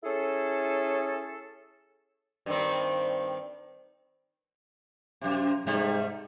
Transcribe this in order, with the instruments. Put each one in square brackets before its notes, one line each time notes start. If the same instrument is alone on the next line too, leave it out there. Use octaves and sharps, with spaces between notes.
[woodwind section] C#4 E4 G#4 A4
[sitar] G2 D#3 C4
F#2 C3
[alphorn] G#2 [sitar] C3 G3 A3